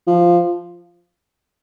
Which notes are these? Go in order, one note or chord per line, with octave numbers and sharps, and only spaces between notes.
F3